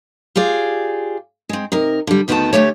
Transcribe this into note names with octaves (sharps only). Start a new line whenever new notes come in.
F4 G4 G#4 D5
G#3 C4
C3 D#4 A#4
D3 G3
D2 D#3 B3 C4 F#4 A5
D2 F#3 A3 G4 C#5